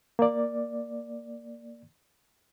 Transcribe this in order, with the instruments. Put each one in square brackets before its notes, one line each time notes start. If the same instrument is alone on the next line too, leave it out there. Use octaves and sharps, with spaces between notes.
[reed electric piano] A#3 D5